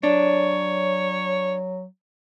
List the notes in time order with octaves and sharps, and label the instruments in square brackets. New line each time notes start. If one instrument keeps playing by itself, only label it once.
[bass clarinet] F#3 [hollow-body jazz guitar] D4 [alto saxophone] C#5